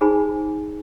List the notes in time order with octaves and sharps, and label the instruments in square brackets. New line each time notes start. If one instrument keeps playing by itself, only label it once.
[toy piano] D#4 G#4 C5 G#5 B5